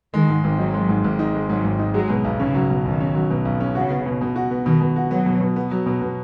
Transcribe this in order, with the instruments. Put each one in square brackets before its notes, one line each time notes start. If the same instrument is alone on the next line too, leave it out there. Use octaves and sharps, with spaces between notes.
[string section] D#3 [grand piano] G#3
[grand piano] G#2
G#1
[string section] F#3 [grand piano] D#4
[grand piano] G#3
G#2
G#1
D#4
G#3
[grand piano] G#2 [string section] F#3
[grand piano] G#1
D#4
[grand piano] F#3 [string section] G#3
[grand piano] B2
B1
[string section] C#3 [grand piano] C#4
[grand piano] F#3
B2
[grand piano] B1 [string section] D#3
[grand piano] C#4
F#3
B2
B1
C#4
[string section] C#3 [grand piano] F#4
[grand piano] B3
B2
B2
F#4
B3
[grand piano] B2 [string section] D#3
[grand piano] B2
F#4
[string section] F#3 [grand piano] B3
[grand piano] B2
B2
B3
F#3
B2
B2